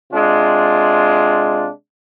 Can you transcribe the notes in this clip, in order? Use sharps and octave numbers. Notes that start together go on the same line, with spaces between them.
C3 G#3 D4 F4